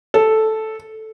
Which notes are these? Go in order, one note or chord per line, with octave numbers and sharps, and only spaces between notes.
A4